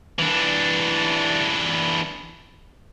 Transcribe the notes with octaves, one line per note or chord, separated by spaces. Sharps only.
E3 D4